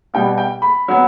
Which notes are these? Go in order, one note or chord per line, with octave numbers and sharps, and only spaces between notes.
B2 G3 B3 G5
G5
B5
F#3 B3